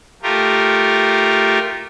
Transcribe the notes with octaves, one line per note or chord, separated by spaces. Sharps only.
A3 F4 G4 A#4